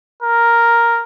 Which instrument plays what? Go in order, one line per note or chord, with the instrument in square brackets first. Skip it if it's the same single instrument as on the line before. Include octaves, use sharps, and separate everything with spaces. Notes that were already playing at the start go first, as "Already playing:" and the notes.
[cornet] A#4